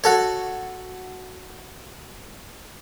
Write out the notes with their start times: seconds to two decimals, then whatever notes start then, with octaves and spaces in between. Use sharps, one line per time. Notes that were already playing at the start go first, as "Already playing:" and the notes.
0.04 F#4 A4 C#5